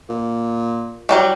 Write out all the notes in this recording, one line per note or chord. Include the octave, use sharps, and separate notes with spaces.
A#2
F#3 G3 A3